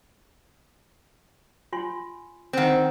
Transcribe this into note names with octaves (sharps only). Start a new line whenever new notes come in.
F4 G#5 C6
D#3 C4 C5 F#5